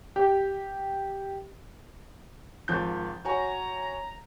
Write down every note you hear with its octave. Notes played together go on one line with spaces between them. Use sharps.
G4
G#1 F3 G6
F#4 C#5 G#5 A#5